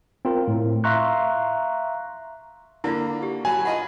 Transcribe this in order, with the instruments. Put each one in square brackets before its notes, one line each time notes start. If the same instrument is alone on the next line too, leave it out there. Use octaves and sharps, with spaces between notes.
[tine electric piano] C4 F4 A#4
A2
E5 F5 A#5 C6 C#6 F#6
[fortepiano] D3 A#3 [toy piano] E4 F4
[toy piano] G4
[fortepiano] F#3 A5 B5 [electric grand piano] G#5 [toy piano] C6
[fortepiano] F4 D#5 B5 [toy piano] F#5